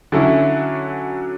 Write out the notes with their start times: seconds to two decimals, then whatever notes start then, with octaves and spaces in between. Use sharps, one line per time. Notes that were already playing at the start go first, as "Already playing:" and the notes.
0.12 D3 F#3 C#4 E4